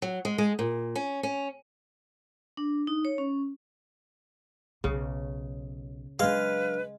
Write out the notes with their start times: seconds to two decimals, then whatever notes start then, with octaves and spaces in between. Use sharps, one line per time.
0.02 F#3
0.25 G#3
0.38 G#3
0.59 A#2
0.95 C#4
1.23 C#4
2.57 D4
2.87 D#4
3.05 C#5
3.18 C#4
4.84 B1 C#3
6.19 F#3 G#3 D4 B4 F5